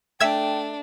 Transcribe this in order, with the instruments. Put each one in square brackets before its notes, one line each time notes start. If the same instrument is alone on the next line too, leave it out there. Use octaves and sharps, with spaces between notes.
[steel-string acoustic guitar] A3 [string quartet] D4 [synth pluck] E5 E6 G#6 [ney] G5